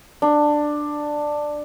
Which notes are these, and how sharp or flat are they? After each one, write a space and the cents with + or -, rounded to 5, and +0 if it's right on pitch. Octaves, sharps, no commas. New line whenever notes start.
D4 +10